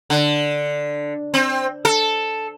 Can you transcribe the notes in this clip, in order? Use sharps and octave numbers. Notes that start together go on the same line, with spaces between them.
D3
C4
A4